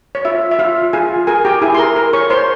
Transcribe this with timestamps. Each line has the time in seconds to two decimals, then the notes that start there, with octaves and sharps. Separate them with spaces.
0.15 C#5
0.25 F4 E5
0.51 E5
0.59 F4 F5
0.93 F4 G#4 G#5
1.27 G#4 A#4 G#5
1.45 G4 G5
1.62 E4 G#4 G#5
1.75 C6
1.79 A#4 A#5
1.96 A#4
2.13 C#5 C#6
2.30 C5 C#5 C6